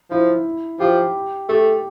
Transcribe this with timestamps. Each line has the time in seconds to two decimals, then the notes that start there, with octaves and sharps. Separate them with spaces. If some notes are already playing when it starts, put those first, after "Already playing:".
0.10 F3 E4
0.80 F3 G4
1.49 A3 G4